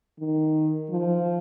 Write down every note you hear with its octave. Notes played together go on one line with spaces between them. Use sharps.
D#3
F3